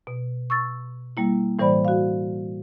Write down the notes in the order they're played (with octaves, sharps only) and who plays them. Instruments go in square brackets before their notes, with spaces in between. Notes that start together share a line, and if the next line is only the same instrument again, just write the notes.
[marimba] B2
C#6 E6 A6
G3 A#3 E4
A2 E3 G3 C5 D5 B5
F#4 F5